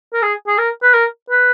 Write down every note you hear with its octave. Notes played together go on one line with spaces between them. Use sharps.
A#4
G#4
G#4
A#4
B4
A#4
B4